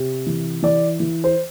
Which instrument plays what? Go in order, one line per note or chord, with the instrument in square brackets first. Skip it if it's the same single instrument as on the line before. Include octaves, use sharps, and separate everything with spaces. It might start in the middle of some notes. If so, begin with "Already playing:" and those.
Already playing: [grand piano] C3
E3
E3 D5
E3
C5